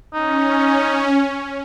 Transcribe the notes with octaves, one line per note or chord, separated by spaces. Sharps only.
C#4 D#4